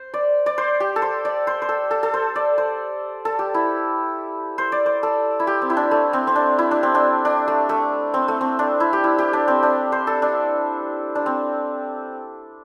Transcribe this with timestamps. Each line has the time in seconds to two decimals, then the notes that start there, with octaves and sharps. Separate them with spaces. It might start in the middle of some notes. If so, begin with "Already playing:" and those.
Already playing: C5
0.14 D5
0.46 D5
0.58 C5
0.80 G4
0.96 A4
1.02 C5
1.25 D5
1.47 C5
1.62 C5
1.69 A4
1.91 A4
2.03 A4
2.14 C5
2.36 D5
2.58 C5
3.25 A4
3.39 G4
3.54 E4
4.58 C5
4.72 D5
4.86 C5
5.03 A4
5.40 E4
5.47 G4
5.62 C4
5.70 E4
5.77 D4
5.91 A3
6.13 C4
6.27 C4
6.36 D4
6.59 E4
6.71 D4
6.83 C4
6.95 D4
7.25 D4
7.48 A3
7.69 A3
8.14 C4
8.28 A3
8.41 C4
8.59 D4
8.80 E4
8.93 G4
9.04 E4
9.18 G4
9.33 D4
9.48 C4
9.63 D4
9.92 C5
10.07 A4
10.22 D4
11.15 D4
11.26 C4